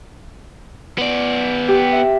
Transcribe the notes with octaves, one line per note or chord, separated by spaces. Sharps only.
B3 D5
G4
E5